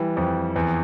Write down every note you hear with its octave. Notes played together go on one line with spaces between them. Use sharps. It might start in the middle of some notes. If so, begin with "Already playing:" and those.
Already playing: E3 G3
F2
E2